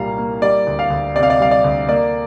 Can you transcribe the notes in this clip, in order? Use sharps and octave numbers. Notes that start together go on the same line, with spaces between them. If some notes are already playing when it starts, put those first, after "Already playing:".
Already playing: C2 A#2 G3 A#3 F5 A#5
A#3
G3 D5
D2
F5
D2
C3 D5
F5
D5
G3 F5
D5
D2
A#3 D5